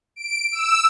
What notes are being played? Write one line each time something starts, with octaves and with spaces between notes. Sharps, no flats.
D7
E6